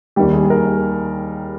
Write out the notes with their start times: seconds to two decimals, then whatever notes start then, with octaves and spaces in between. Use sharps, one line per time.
0.16 D#2 D#3 G3 G4
0.33 G#4
0.44 G#4
0.50 A#4